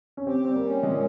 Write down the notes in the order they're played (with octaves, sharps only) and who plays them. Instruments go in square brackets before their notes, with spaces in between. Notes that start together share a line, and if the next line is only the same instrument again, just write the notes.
[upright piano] C#4
[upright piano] C4 [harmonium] G4
[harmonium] G3 [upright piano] C4
[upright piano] A#3
[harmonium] C#4
[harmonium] A#2 [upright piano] G#3